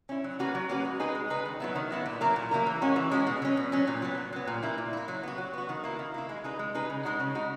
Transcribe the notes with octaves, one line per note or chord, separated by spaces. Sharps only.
C#4 E4
F#3
A#3 C#4 F#4 B4
F#3
A#3 C#4 F#4 B4
G#3
D#4 G#4 B4
G#3
D#4 G#4 B4
D#3
F#3 B3 E4
D#3
F#3 B3 E4
A#2
F#3 A#3 E4 A#4
A#2
F#3 A#3 E4 A#4
E3
G#3 C#4 F#4
E3
G#3 C#4 F#4
B2
F#3 C#4
B2
F#3 C#4
A#2
F#3 B3
A#2
F#3 B3
A#2
A#3 E4
A#2
A#3 E4
F#3
B3 F#4
F#3
B3 F#4
D#3
A#3 E4
D#3
A#3 E4
G#3
D#4 G#4 B4
G#3
D#4 G#4 B4
C#3
G#3 D#4 F#4
C#3
G#3 D#4 F#4